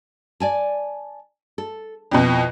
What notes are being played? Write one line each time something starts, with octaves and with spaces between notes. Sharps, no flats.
D5 G#5 A5
A4
F2 B2 E4 F4